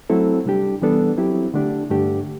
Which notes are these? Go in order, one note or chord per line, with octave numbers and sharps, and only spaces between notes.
F#3 A3 C4 E4 A4
C3 G3 D4 G4
E3 G3 B3 D4 A4
F#3 C4 E4 G4
D3 A3 D4 G4
G2 D3 A3 D4 G4